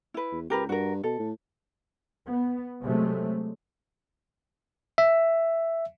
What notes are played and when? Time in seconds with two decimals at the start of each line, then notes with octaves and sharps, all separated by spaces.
0.14 E4 B4
0.32 E2
0.50 C#2 G4 A#4 B4
0.69 G2 F#4 A#4
1.03 B2 A4
1.19 A2
2.28 B3
2.82 C3 F#3 G#3 A3
4.98 E5